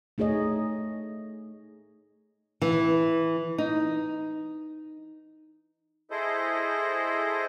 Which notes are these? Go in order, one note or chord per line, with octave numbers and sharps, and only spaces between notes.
A3 D#4 G#4 C#5 D#5
E3
D#4
E4 G#4 A4 C5 D#5